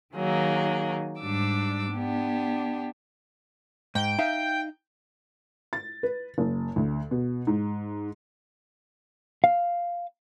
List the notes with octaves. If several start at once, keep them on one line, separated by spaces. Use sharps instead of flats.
D#3 F#3 A#3 G#4
G#2 G3 D4 D6 E6
B3 D4 G4
G#2 G5
D#4 E5 F5
A6
B4
F#1
D2
B2
G#2
F5